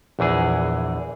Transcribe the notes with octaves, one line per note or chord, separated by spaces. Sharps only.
A#1 E2 E3 G#4